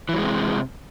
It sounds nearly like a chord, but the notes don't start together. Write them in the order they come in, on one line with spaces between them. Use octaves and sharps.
E3 F#3 G#3 C3